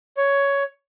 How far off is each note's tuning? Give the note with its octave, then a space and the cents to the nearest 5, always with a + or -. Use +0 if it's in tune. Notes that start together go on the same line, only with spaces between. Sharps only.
C#5 +10